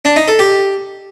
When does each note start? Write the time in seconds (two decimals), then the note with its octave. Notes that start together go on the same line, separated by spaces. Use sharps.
0.05 D4
0.16 D#4
0.28 A4
0.39 G4